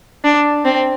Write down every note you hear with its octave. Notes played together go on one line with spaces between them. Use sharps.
D4
C4